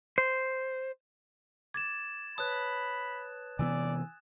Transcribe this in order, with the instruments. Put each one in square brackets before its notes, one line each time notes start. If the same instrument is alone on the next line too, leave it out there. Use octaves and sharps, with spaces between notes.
[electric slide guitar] C5
[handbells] D6 [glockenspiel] G#6 A6 E7
[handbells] B4 C#5 A5 [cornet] B5 [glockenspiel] D#6 F#6
[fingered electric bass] C3 E3 B3 [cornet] D5 [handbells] G#5 E6